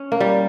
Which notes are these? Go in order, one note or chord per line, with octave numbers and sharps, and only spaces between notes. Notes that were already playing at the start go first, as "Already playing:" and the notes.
Already playing: C#4
A#3
G3